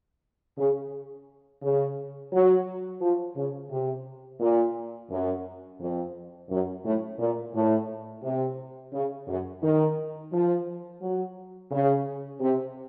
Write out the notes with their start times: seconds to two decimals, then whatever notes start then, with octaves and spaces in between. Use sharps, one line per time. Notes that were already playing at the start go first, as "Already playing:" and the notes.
0.58 C#3
1.62 C#3
2.32 F#3
3.01 F3
3.36 C#3
3.71 C3
4.40 A#2
5.10 F#2
5.80 F2
6.49 F#2
6.84 A2
7.18 A#2
7.54 A2
8.23 C3
8.93 C#3
9.28 F#2
9.63 D#3
10.32 F3
11.02 F#3
11.71 C#3
12.41 C3